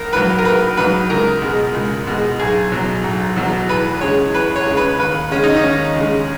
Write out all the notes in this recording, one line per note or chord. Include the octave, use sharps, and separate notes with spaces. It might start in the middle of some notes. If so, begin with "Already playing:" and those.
Already playing: A#1 A#4
G#2 F#3 B4
A#4
A#1 B4
G#2 F#3 B4
C#2 A#4
B2 G#3
C#2
B2 G#3
B1 G#4
B2 F#3
B1
B2 F#3
E2 B4
C#3 G#3 C#5
E2 B4
C#5
C#3 G#3
B4
D#2 B4
C#3 G#3 C#4
D#4
C#4
D#2
C#3 G#3